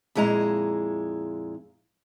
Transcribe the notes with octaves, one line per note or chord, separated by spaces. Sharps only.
F2 A#2 G#3 E4 A#5